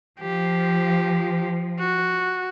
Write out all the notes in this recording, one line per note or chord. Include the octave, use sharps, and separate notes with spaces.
F3 G4
F#4